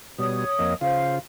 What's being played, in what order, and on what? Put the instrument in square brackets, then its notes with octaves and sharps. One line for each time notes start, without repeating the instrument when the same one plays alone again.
[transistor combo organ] B2 G3 [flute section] C#5 D#6
[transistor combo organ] F2 A#3 D#5
[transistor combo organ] C#3 F4 [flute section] C5 F5